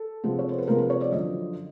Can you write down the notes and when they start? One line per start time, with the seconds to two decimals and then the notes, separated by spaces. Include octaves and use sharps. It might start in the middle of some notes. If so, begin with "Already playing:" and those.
Already playing: A4
0.24 C3 F3 G#3 B3
0.39 C#5
0.49 C5
0.58 B4
0.68 C3 F3 G#3 B3 A#4
0.78 B4
0.90 C#5
1.01 D5
1.12 F#2 D3 F3 D#5